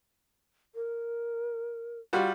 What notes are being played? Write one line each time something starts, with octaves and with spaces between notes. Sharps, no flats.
A#4
G3 F4 F#4